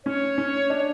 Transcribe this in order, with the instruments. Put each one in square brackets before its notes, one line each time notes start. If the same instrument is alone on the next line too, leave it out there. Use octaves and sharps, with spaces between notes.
[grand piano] C#4 [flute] C#5
[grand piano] C#4
D4